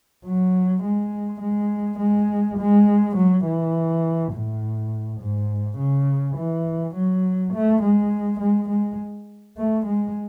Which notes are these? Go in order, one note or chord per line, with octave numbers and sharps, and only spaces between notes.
F#3
G#3
G#3
G#3
G#3
F#3
E3
A2
G#2
C#3
E3
F#3
A3
G#3
G#3
G#3
A3
G#3